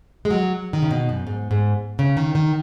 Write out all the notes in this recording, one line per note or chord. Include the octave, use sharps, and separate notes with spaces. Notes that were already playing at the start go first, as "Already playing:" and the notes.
G#3
F#3
D#3
C#3
B2
F#2
G#2
G#2
C#3
D#3
D#3